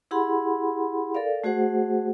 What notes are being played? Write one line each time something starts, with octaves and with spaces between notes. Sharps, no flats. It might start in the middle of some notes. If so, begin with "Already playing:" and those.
E4 G4 G#4 F#5 B5 C6
A4 A#4 D5 F5
A3 F#4 G#4 C5 F#5